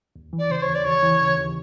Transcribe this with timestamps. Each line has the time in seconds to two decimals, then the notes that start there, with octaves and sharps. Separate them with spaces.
0.16 D#2
0.33 E3
0.39 D5
0.50 C#3 C5
0.62 C#5
0.68 D#2
0.75 D5
0.85 D#2 C#5
1.03 E3
1.20 C#3
1.37 D#2